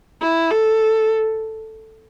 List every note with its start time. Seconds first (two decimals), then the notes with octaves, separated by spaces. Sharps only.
0.22 E4
0.51 A4